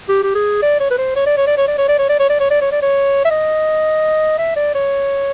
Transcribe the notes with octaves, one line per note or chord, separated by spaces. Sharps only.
G4
G4
G#4
D5
C#5
B4
C5
C#5
D5
C#5
D5
C#5
D5
C#5
D5
C#5
D5
C#5
D5
C#5
D5
C#5
D5
C#5
E5
D#5
E5
D5
C#5